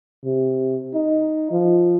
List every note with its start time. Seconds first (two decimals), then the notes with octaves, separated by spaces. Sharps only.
0.25 C3
0.94 D#4
1.51 F3